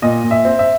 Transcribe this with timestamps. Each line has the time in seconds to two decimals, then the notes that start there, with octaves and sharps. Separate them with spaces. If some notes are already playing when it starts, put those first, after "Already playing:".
0.02 A#2 D#5
0.24 A#2
0.31 E5
0.45 C4
0.59 E5